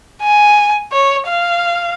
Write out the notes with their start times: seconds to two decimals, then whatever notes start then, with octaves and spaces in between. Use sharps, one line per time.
0.22 G#5
0.92 C#5
1.28 F5